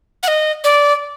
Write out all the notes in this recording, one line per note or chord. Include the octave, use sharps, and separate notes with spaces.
F#5
D#5
D5